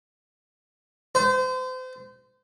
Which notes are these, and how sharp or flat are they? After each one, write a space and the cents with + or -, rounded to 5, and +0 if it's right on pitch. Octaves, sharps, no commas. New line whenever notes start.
C5 -35